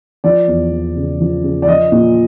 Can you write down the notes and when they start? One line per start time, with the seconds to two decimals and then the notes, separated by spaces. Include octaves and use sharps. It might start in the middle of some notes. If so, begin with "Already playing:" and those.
0.24 F3 D5
0.47 E2
0.72 E2
0.96 C#3
1.20 F3
1.43 C#3
1.62 D5
1.67 F3 D#5
1.92 A#2